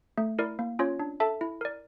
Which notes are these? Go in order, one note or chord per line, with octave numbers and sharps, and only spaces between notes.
A3
E4 A#4 D5
A#3
C#4 F4 C#5
D4
A4 E5 A5
E4
A#4 D5